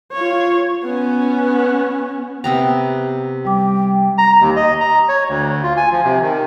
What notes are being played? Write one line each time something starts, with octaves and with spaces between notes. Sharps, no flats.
F4 C#5
B3 C#4
C3 B3 G5 A#5
G3 G5 D6
A#5
D#2
D#5
A#5
C#5
D2
F4
G#5
F3
C3
D#3